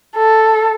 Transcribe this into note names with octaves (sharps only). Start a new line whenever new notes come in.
A4